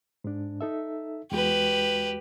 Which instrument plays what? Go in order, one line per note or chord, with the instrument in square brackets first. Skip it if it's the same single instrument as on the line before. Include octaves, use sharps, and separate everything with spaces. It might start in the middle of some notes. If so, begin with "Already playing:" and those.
[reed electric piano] G#2 D4
D#4 A4 E5
[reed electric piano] E2 G#3 F#4 [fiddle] G4 B4